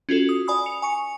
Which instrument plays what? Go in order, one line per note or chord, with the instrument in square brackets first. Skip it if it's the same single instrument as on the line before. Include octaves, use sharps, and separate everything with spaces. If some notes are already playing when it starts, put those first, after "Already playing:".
[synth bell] C#4 F4 F#4 A4
D#6
D5 G#5 B5 D#6
C#7 F7
G#5 C#6 C#7